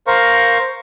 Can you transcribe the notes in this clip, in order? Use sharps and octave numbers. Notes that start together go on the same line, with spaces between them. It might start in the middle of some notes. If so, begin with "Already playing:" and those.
A#4 C5 F5 A#5 C#6